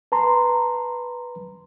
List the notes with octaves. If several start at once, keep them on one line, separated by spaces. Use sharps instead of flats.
B4 A5 A#5 C6